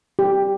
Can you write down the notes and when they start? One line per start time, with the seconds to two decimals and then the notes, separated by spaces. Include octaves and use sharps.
0.19 G4